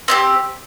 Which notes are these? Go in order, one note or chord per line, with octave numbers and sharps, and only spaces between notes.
C4 E4 G4